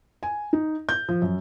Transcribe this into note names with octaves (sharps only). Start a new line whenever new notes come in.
G#5
D#4
G6
F3
F#2